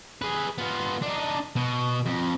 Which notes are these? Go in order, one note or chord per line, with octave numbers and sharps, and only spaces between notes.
G#4 B4
B3 F4
D4 D#4
B2
F2